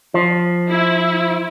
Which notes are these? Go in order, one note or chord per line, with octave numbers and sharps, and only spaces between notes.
F3
E4